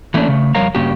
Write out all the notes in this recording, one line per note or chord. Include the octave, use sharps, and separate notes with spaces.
E3 A3 A#3 C#4 D4
C#3 A3
F2 G3 A#4 C#5 F5 A#5
G2 C#3 A#3 F#4 G4